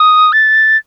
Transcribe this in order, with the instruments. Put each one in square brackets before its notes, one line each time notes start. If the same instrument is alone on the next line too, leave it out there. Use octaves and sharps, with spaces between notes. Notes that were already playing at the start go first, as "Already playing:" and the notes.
Already playing: [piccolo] D#6
A6